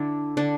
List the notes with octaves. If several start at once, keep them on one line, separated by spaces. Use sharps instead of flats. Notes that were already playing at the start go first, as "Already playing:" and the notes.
Already playing: D3 D4 E4
D3 D4